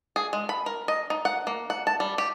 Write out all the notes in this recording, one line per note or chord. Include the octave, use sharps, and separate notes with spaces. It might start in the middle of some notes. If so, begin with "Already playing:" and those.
G#4
G#3
B5
A#4
D#5
D#4
F#5
A#3
F#5
A5
G3
G4